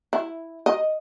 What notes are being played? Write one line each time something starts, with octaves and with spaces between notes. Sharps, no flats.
E4
D#5